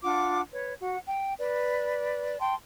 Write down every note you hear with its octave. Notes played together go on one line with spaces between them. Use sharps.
D4 F4 F#5 D6
B4 C#5
F#4 F#5
G5
B4 D5
G5 A5 C6